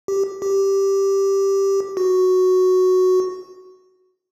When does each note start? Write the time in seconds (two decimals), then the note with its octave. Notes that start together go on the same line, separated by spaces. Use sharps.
0.08 G4
0.42 G4
1.97 F#4